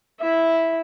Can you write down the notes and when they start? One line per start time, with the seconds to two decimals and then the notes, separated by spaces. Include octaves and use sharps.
0.20 E4 E5